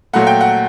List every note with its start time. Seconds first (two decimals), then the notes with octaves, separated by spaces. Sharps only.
0.13 A#2 F#3 A3 F#5
0.27 G5
0.41 F#5